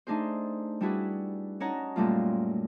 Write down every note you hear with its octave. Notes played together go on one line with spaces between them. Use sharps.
A3 D4 D#4 G#4 C5
G3 D4 E4 F#4 G#4 B4
C#4 D#4 C#5 F#5 A5 A#5
F#2 A#2 G3 A3 F4